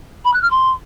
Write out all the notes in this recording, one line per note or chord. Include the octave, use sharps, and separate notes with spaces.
B5
F#6
F6
C6